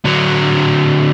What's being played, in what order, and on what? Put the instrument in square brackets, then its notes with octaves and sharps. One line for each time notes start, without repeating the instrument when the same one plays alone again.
[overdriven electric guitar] D3 F#3